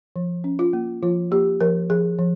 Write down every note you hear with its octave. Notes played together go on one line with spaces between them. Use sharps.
F3
C#4
F4
A#3
F3 F4
A#3 G4
F3 A#4
F3 G#4
F3